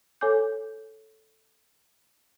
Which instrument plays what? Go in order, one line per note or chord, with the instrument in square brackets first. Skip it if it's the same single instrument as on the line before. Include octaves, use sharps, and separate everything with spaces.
[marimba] A4 C#5 G#5 D6 G6